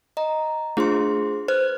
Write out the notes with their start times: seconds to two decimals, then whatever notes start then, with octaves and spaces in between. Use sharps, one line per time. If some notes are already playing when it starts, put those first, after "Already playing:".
0.17 D#5 A#5
0.77 A3 D4 F4 G#4 C5 C6
1.48 B4 C5 F6 F#6